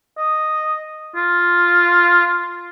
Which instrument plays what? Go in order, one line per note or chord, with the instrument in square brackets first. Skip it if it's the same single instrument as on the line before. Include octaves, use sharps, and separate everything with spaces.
[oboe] D#5
F4